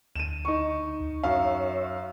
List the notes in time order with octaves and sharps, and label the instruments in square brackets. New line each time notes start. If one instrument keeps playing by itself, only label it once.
[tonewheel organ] D2 [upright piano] D#7 E7
[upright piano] D#4 C#6
[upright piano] F#2 F5 [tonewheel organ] C#5 E5